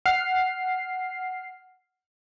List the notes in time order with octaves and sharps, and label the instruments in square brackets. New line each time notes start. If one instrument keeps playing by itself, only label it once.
[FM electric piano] F#5 F6 C7